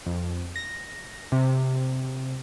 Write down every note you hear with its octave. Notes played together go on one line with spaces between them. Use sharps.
F2
A#6
C3